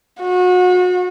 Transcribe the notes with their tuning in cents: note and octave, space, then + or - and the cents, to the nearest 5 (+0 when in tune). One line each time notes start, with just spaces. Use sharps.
F#4 -35